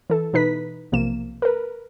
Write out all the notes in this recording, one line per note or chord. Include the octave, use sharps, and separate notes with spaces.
E3 A4
B2 E3 D#4 B4 B6
B1 C3 F3 A#3 E7
A#4 B4